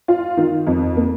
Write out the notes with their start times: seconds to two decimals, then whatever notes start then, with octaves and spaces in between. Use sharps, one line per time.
0.08 F4
0.37 D#3
0.67 F2
0.96 A#3